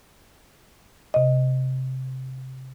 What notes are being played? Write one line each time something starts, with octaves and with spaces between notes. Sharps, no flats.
C3 D#5